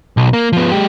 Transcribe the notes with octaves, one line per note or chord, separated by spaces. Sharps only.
B1
A#3
F3 B3
G#3 G4